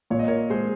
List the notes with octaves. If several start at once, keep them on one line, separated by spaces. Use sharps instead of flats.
A#2 C#5
D#5
A#4 C#5
G#3 G#4 C5